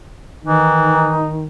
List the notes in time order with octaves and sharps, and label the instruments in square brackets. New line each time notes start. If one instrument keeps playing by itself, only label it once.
[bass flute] D#3 [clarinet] E3 [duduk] D#4